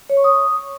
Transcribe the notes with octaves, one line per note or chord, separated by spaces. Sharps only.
C#5
C#6
D#6